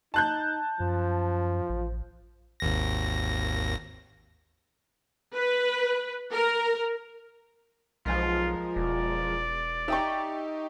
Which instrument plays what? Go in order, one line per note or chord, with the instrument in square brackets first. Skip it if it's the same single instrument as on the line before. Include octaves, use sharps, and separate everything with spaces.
[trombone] D#4 [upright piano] A5 F#6 G6
[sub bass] F#2 [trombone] F3
[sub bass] A1
[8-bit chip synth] G#1 D#2 A#6
[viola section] B4
A#4
[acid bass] B1 [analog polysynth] F3 G#3 A#4 [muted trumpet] F4
[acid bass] E1 [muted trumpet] D5
[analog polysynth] D#4 G4 [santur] E5 G5 C#6